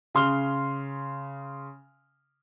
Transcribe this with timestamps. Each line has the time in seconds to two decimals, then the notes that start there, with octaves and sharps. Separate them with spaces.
0.15 C#3 C6 F6 G7